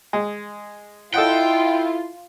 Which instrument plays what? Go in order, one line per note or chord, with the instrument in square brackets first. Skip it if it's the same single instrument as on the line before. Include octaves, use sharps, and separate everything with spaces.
[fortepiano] G#3
[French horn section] E4 [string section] F4 [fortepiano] A4 D#5 F#5 [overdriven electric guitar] G5